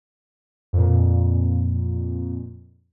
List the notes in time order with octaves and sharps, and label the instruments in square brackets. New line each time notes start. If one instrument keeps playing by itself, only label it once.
[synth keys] F2 A#2